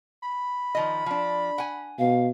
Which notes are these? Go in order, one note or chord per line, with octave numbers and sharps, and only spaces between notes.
B5
D#3 F3 D#5
F3 D4
F#5 G#5
B2 F5